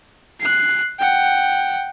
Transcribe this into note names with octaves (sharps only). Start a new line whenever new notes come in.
F#6 C7
F#5 G5